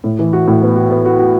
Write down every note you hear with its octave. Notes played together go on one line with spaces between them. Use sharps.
A2
E3
F#4
A2
B3
F#4
B3
F#4
F#4